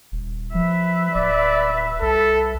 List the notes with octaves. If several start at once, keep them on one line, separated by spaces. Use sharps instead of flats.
D#1
F3 B4 E5
D1 D5
C2 A4